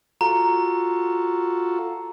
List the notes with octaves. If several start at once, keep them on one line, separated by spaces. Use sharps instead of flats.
F4 F#4 A4 A#5